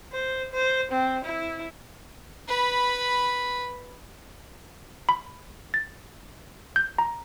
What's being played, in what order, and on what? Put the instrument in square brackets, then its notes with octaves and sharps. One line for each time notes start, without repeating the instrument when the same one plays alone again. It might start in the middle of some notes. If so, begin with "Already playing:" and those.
[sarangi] C5
C5
C4
E4
[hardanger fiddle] B4 B5
[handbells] B5
A6
G6
A#5